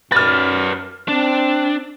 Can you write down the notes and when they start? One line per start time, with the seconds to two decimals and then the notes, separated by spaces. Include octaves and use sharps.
0.12 F#2 B4 D5 F6 A6
1.09 C4 D4